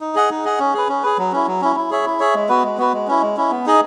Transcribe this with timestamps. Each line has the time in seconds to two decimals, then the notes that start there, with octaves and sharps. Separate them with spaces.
0.01 D#4
0.15 G#4 D#5 F#5
0.30 D#4
0.45 G#4 D#5 F#5
0.59 C#4
0.73 G#4 B4
0.89 C#4
1.03 G#4 B4
1.18 F#3
1.32 C#4 E4
1.47 F#3
1.61 C#4 E4
1.76 E4
1.91 G#4 C#5 E5
2.05 E4
2.20 G#4 C#5 E5
2.35 G#3
2.49 B3 F#4 B4
2.63 G#3
2.78 B3 F#4 B4
2.93 G#3
3.08 C#4 E4
3.22 G#3
3.37 C#4 E4
3.51 B3
3.66 D#4 G#4 D#5